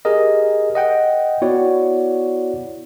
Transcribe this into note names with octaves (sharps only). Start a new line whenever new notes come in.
G4 G#4 A#4 D#5
D#5 F#5 G5
B3 E4 F#4 C#5 D5 F#5